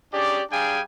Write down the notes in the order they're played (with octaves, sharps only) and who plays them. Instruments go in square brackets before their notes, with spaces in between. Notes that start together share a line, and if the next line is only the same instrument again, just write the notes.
[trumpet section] C#4 D4 G4 G#4 D5
G3 D4 G#4 F5 G5 G#5